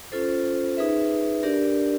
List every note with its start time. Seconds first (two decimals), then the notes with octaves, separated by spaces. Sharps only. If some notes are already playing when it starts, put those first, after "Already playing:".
0.12 C#4 F4 A4 C5
0.77 D#4 G#4 B4 E5
1.43 D4 G4 A#4 D5